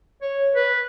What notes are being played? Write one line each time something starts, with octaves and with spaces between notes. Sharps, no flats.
C#5
B4